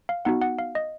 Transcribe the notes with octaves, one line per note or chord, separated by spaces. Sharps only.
F5
B3 D#4 F#4 F#5
F#5
F5
D#5